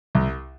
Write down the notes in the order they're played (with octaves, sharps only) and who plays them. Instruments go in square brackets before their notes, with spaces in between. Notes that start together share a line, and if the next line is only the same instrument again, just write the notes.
[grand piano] C2